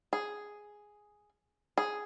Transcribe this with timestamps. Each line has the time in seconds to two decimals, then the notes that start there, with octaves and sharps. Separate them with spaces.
0.13 G#4
1.77 G#4